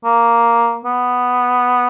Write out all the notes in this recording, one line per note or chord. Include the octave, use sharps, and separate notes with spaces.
A#3
B3